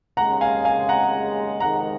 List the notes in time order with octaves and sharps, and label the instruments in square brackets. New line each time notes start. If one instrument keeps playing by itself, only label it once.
[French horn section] D#2 C#3 G#3 [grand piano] F#5 A#5
[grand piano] F5 G#5
F5 G#5
F#5 A#5
[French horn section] F2 C3 D#3 G#3 [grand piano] F#5 A#5